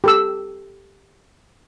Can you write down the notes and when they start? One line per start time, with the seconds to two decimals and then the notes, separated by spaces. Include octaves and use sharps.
0.04 G4 A4 E6